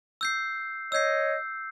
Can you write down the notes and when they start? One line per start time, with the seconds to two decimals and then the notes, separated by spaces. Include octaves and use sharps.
0.21 E6 G6 C7
0.92 C#5 D#5 E6 G6 C7